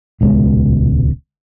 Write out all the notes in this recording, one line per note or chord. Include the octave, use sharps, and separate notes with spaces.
D#1 C#2 B2 G#3